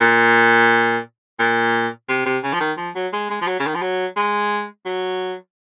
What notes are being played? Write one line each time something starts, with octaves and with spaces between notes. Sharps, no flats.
A#2
A#2
C3
C3
C#3
F3
D#3
F3
F#3
G#3
G#3
F3
F#3
C#3
D#3
F3
F#3
G#3
F#3